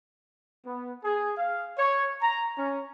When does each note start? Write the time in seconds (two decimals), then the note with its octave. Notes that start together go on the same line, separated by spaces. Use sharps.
0.66 B3
1.04 G#4
1.38 F5
1.78 C#5
2.22 A#5
2.58 C#4